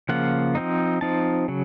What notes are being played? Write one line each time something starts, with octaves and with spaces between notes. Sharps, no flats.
C#3 F3 A#3 F4 F#5
F3 C4 D#4
F3 C4 D#4 A5
C#3 F#3